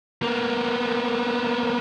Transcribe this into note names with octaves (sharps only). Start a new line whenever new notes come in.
A#3 B3